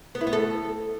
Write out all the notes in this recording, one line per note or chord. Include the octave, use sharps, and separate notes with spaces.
B3
E4
B3
A4